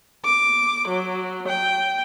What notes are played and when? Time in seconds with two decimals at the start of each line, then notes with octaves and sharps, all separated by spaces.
0.23 D6
0.87 F#3
1.46 G5